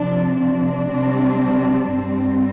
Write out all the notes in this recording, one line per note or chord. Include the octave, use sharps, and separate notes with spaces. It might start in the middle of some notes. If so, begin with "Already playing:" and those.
Already playing: C3 F3 C4 D4
D4
C3 G3 C4
G2 G3 C4